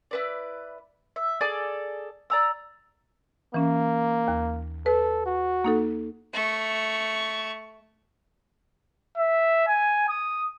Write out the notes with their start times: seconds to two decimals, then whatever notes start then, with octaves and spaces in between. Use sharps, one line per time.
0.11 E4 B4 D5
1.16 E5
1.41 G#4 A4 D5 D6
2.30 D5 A#5 E6
3.54 E3 A#3 C#4
4.28 D#2
4.86 A4 B4
5.26 F#4
5.64 A#3 D#4 A4
6.33 A3 C#6
9.18 E5
9.68 G#5
10.09 D#6